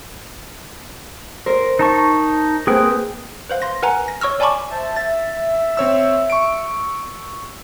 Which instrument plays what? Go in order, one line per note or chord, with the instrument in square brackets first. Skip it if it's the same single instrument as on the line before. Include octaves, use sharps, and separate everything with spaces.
[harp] A#4 C5
[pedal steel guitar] D#4 A5 C#6
[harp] A#3 C4 [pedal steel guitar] G#4 B4 G5
[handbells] B4 C5 F5
C6 A#6
A#4 B4 F#5 G#5 A#5
A#6
C#5 C#6 E6 F6
D5 G#5 A5 B5 C#6 D6
[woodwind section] C5 E5 A5
[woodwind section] E5 [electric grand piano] A6
[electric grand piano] C4 C#5 E6
C#6 D7